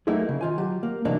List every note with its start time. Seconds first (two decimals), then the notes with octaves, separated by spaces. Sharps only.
0.07 F#3 A3 A#3 D#4 E4 G#4
0.29 C#3
0.41 D#3 F4 G#5
0.58 F#3 G4
0.83 A#3
1.05 C3 E3 F#3 A#3 D4 D#4